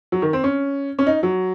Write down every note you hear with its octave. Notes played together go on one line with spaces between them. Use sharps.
F#3
D#3
C4
C#4
C#4
D#4
F#3